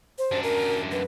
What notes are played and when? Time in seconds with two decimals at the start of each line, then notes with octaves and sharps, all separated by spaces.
0.18 C5
0.32 F#2 D4
0.43 A#4
0.92 B4